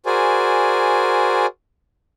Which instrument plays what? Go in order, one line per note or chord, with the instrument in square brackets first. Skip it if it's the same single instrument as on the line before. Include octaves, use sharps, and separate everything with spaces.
[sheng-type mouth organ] F#4 G#4 A#4 C5 D5 G#5